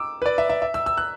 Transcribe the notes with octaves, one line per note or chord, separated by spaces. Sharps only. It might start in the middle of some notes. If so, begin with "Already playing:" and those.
Already playing: D6 E6
B4
D5
E5
E5
E5
E6
E6
F#6